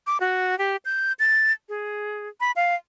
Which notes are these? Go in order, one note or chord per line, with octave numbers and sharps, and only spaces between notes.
D6
F#4
G4
G6
A6
G#4
B5
F5